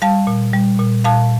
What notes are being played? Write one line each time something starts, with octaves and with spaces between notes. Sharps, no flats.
G3 F5 A5
A#2
G3
A#2
A#2 F5 A5